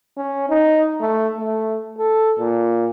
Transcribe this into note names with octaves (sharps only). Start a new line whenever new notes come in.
C#4
D#4
A3
A3
A4
A#2